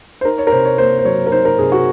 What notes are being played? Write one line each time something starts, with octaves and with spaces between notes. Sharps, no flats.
C5
D#4 A#4
C#5
A#4
C3 C5
C#5
A#3 C5
C5
F#3 C#5
A#4
D#4 C5
A#4
C3 G#4
F#4